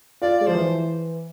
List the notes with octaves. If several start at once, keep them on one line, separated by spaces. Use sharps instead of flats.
F4 D5
G#3 D5
F3 C5
E3